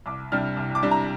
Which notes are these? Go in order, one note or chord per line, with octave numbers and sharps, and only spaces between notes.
C2 D6
C3 G3 D4 F6
C2
D6
C3 G3 D4
A#5